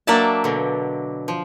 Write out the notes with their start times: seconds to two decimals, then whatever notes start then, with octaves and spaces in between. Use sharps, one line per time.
0.07 F#3 A#3 D4 D5 E5 A5
0.44 B2 D3
1.28 F3